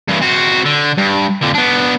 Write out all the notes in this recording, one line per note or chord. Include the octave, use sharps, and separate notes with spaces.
G2 E3
C4 F#4
D3
G2
F2 D3
B3 D4